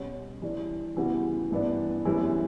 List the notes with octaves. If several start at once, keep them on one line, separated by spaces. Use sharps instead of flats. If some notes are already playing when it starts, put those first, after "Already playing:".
Already playing: B2 G3 C#4 F#4 C#5
E3 G3 D4
C#3 E3 G3 B3 F#4
G2 E3 B3 D4
F#2 E3 G3 C#4 E4